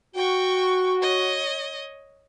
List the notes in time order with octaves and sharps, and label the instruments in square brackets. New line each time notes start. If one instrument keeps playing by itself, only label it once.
[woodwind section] F#4 [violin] G5 C#6
[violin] C#5 D#5